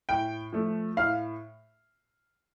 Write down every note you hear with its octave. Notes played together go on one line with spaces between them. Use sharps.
A2 G5
F3 A3
A2 F5